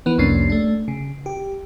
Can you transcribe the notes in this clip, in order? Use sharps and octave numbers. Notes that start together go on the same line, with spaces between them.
E3 B3
C2 F2 A#3 C#4 D4 C7
A3 D4
C#3
G4